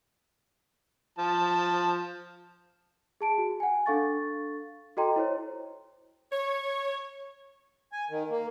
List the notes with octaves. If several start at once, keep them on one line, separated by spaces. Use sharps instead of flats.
F3 A5
G#4 A5 D7
F#4
F#5 G#5
D4 A4 F5 C#6 A6
F#4 A4 D#5 G5 A#5 C6
E4 C5 C#5
C#5
G#5
D#3
A#3